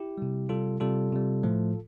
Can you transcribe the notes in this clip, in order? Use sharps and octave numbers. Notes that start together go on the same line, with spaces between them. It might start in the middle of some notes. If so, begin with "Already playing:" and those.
Already playing: E4 G4
C3 G3
C3 G3 F4 A4
C3 G3 F4 A4
C3 G3
A2 F3 A3